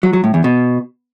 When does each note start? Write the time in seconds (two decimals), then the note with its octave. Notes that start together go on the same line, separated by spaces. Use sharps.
0.03 F#3
0.13 F#3
0.24 A2
0.34 E2
0.44 B2